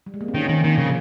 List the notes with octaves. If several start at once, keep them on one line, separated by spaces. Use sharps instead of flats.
G3
G#3
A#3
C4
D#3 C#4
D#3 C4
D#3 A#3
C#3 F3